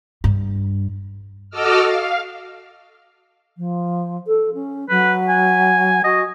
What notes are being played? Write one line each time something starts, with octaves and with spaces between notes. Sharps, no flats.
G2
F#4 A4 D#5 D6 E6 F6
F5
F3
A4
C#4
F#3 B4
G#5
F#4 D#5